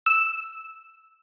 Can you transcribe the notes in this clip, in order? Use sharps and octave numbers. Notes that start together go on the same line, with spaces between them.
E6